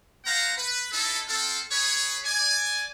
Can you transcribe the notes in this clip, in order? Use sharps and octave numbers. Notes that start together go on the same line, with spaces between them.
B3 C5 F5 F#5 A#5
B4
D#4 E4 A4
C4 F4 A4
G#4 B4 C#5
D5 G#5